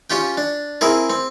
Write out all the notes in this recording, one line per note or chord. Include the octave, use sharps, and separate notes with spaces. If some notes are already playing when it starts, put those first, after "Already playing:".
C#4 F4 G4 G5
D4
C4 E4 G#4 A#4
C4